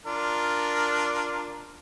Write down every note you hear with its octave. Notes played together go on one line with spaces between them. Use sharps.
D4 F4 A#4